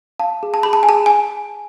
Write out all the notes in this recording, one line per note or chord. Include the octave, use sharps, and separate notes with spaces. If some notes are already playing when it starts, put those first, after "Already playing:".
F5 A5
G#4
A5
G#4 B5
A5
G#5
G#4 A5
G#5